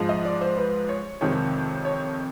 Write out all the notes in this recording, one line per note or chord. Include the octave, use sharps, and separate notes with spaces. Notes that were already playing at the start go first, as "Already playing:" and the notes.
Already playing: G#2 F3 G#3
D#5
D5
C5
B4
C#5
F2 C3 D#3 G#3 C#5
C#5